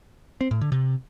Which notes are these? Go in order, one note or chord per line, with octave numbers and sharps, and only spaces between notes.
C4
A2
D3
C3